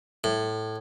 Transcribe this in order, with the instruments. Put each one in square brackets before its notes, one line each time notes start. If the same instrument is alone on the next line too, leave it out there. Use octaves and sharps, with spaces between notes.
[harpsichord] A2